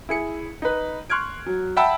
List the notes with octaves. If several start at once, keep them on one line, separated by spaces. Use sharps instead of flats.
E4 G#4 C#7
D#4 B4
C6 C#6 F6 F#6 G#6 D7
F#3
E5 F#5 G5 A5 B5 E6